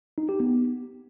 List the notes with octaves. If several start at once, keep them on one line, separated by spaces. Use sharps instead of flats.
D#4
G4
B3